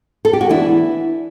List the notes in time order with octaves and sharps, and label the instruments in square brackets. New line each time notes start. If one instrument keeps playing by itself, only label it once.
[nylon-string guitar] A4
G4
F#4
E3 B3 D4 E4